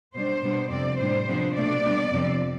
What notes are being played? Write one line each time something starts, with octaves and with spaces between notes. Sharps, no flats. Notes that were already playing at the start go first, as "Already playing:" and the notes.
B2 G3 D4 C5
B2 G3 B3 D4
F2 C3 G3 C4 D5
A2 G3 D4 C5
C3 F3 B3 D4
B2 A3 D4 D5
D3 G3 B3 D4
F2 C3 F3 C4